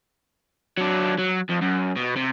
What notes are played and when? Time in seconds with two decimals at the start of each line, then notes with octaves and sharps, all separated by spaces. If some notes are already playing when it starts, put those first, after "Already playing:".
0.77 F#3 D4
1.19 F#3
1.50 F2
1.62 F#2
1.96 B2
2.16 C3